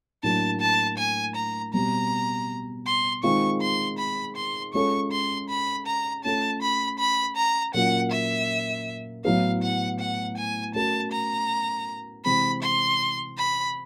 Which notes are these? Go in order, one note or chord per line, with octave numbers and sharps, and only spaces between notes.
A2 F#3 A#3 D4 A5
A5
G#5
A#5
B2 G3 C4 A#5
C6
D#3 G#3 C4 F4 G#4 C#6
C6
B5
C6
G#3 C#4 F4 A4 C#6
C6
B5
A#5
A3 C#4 F4 A4 A5
B5
B5
A#5
A#2 F#3 A#3 C#4 F4 F#5
E5
A2 F#3 B3 E4 F5
F#5
F#5
G#5
A3 C#4 F#4 A#4 A5
A#5
C3 E3 G#3 C4 B5
C6
B5